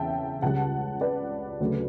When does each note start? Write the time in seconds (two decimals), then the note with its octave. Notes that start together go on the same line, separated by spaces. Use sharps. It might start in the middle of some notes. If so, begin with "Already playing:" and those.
Already playing: E2 C#3 E5 F#5 G5 A5
0.42 C#2 C#3 G3 F#5 A5
1.01 B4 D5
1.60 D2 C#3 F#3 A3